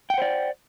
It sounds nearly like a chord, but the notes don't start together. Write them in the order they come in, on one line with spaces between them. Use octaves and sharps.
G5 F#5 C5 D5